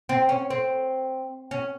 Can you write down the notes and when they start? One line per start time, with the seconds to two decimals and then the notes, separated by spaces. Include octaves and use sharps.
0.09 C4
0.29 C#4
0.50 C4
1.51 C#4